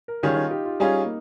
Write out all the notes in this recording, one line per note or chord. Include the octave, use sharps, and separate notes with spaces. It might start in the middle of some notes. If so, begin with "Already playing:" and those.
A#4
D#3 G3 C#4 F4 G#4
D#4
G4
F4
G3 C#4 D#4 F4 G#4
A#3